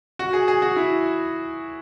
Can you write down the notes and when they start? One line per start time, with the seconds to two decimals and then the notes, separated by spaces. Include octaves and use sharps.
0.19 F#4
0.33 G#4
0.48 G#4
0.62 F#4
0.76 E4